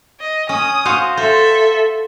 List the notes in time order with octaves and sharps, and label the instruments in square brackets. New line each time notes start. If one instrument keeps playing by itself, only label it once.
[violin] D#5
[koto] C#4 [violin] D#6
[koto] F#4 C5 F5
[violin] A4 E5 [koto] C5